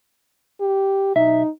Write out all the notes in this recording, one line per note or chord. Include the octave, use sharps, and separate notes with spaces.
G4
B1 D#4 E5